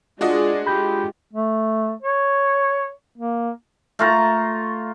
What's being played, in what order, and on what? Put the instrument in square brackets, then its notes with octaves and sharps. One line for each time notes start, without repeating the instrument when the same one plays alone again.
[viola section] G#3 G#4 [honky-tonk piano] D4 F#4 D#5 [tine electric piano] F4 [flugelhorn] D5
[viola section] G#3 F4 [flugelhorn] G4 [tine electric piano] B5 G6
[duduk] A3
C#5
A#3
[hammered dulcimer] A3 F4 A#5